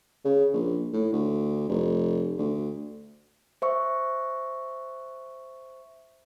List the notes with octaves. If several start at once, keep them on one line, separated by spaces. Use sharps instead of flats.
C#3
A#1
A2
D2
F1
D2
C5 E5 C#6